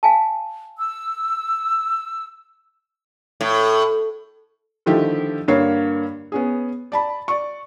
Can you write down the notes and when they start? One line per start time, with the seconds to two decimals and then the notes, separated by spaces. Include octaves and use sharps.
0.03 F5 G#5 A5
0.77 E6
3.41 A2
4.86 D3 D#3 F3 A3 E4 G4
5.48 G2 D3 A#3 C#5 F5 C7
6.32 B3 C#4 G#4
6.92 D5 A5 B5
7.28 D5 C#6